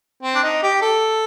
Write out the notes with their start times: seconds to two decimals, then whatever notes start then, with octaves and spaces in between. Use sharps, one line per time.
0.23 C4
0.35 D4
0.43 D#4
0.63 G4
0.82 A4